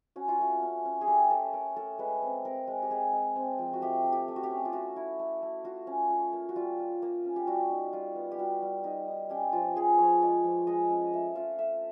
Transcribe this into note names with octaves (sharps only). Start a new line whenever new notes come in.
C#4 F#4
F4
A3 F#4
C#4
C#4
G#4
A3 G4
C#4 A4
A3 A#4
A3 A4
G#3 B4
C4
C4 A#4
G#3
G4
G#3 G#4
G#3
C4
F3
F#4
A3 G4
A3
G4
A3
F#4
G4
C#4
F4
A3 F#4
E4
A3
A3
F4 F#4
C#4
F4
A#3
F#4
G3 F4
F4
A#3
C#4
G4
G3 F#4
D#4
G3 F4
B3
G4
G3 F#4
G3
D#4
D#4
C#4 G4
F3 F4
F3 G#4
F3 C#5
G#3 D5
F3
G#3 D#5
C#4
A3 E5
F4 F5
A3 E5